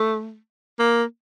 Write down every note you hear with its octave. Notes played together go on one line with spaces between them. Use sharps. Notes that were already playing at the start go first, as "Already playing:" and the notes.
Already playing: A3
A#3